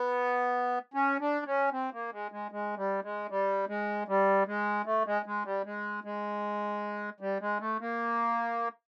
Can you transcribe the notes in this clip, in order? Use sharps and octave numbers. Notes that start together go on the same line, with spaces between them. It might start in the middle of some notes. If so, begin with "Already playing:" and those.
Already playing: B3
C#4
D4
C#4
C4
A#3
G#3
G#3
G#3
G3
G#3
G3
G#3
G3
G#3
A3
G#3
G#3
G3
G#3
G#3
G3
G#3
A3
A#3